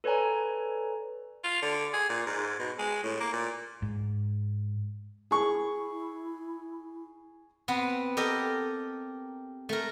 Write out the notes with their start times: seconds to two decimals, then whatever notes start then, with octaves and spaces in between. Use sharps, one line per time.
0.04 A4 B4 C#5 D5 G#5 A#5
1.44 F4
1.62 D3
1.93 G#4
2.09 A#2
2.26 G#2
2.59 B2
2.78 G#3
3.04 A2
3.20 A#3
3.33 A#2
3.82 G#2
5.31 E4 G#4 C#6
7.68 B3 C4 B4
8.17 G4 A4 A#4 D#5
9.69 A3 A#4